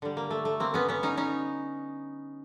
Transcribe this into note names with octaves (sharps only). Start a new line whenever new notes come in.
D3 G3
A#3
A3
A3
A#3 C4
B3 C#4
B3 C#4
C#4 D#4
C#4 D#4